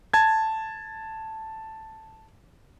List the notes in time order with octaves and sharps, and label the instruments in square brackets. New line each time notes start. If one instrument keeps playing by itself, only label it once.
[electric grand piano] A5 G#6